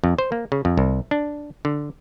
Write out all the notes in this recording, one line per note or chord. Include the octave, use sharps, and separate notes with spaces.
F2
C5
A#3
C#3
F2
C2
D4
D3